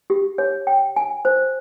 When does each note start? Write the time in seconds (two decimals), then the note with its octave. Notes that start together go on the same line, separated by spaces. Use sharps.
0.10 G4
0.38 C#5
0.67 G5
0.96 G#5
1.25 C5